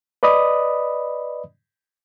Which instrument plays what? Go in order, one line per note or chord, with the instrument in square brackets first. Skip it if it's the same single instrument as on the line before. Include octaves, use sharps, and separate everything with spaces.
[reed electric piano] B4 D5 D#5 B5 D#6